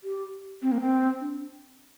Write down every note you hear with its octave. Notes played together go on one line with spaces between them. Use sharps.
G4
C4
A#3
C4
D4